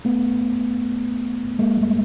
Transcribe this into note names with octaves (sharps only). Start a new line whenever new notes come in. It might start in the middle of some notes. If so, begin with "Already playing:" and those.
A3 B3
G#3 A#3
G3 A3